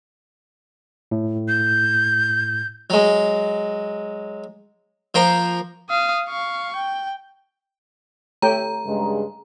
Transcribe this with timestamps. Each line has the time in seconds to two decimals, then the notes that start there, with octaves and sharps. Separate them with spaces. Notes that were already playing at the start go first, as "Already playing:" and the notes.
1.11 A2
1.48 G6
2.90 F#3 G#3
5.15 F3 A#3 C5 G5 A#5
5.89 F5 D#6
6.26 F5 C#6
6.76 G5
8.42 A3 G4 C#5 G5 A#5
8.86 G2 C#3 G#3